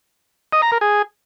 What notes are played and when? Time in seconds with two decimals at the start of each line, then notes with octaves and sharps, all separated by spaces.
0.53 D#5
0.62 A#5
0.72 A#4
0.81 G#4